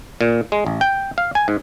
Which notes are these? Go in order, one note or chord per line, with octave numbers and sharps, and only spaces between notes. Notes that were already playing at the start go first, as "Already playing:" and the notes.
A#2
G#3
A1
G5
F5
G#5
G#2